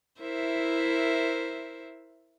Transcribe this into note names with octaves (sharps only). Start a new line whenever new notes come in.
E4 A#4 C5 E5